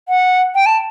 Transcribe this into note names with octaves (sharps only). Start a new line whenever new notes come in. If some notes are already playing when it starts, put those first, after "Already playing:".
F#5
G5
A5